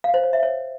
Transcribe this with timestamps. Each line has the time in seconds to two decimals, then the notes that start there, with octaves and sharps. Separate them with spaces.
0.04 F5
0.14 C5
0.23 C#5
0.33 E5
0.43 C#5